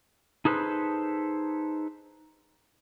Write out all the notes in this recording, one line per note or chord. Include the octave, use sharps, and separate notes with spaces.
D#4 G#4 A4 B4 C5